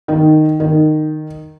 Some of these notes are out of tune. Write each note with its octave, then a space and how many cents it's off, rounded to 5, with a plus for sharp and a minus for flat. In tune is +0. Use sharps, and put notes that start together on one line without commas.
D#3 -10
D#3 -15